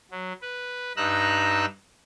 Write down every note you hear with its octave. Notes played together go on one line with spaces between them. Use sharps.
F#3
B4
G2 D#4 A#5 E6 F#6